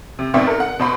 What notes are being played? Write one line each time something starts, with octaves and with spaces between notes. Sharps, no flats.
C3
G#1 B2 C4 D5 E5 C#6
A4 A#4
F#5
B2 C5 B5 C#6